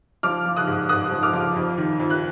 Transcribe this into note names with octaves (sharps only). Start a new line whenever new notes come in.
F3 D6 F6
F3
D#6 F#6
G#2
G#2 D#6 F#6
F3
D6 F6
F3
F2
D#3
F2
F#6